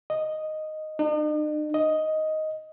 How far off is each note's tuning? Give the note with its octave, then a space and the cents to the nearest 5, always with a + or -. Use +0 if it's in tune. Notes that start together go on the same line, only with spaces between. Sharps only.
D#5 -5
D#4 -45
D#5 +5